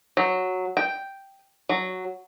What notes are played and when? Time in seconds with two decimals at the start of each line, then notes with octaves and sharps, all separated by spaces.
0.17 F#3
0.77 G5
1.69 F#3